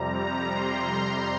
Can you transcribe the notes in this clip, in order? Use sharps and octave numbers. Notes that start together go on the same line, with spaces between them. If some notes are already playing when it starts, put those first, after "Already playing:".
Already playing: F2 C3 G3 A#5
A#5
C6